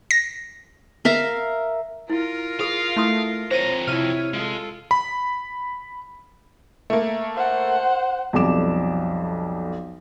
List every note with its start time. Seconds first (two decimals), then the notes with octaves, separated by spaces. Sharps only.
0.11 A#6
1.05 A#4 E5 F5 A#5
2.10 E4 F4 A#4
2.60 G#4 F5 D#6
2.96 A3 E4 C6 D#6
3.51 F2 C5 C#5 A#5 D#7
3.87 C3 E4 C#5 F6 D#7
4.34 G#3 F4 A4
4.91 B5
6.90 A3 A#3
7.36 C5 F#5
8.33 B1 F2 G3 D6 E7